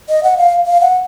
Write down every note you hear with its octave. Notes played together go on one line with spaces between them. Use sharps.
D#5
F#5
F5
F5
F#5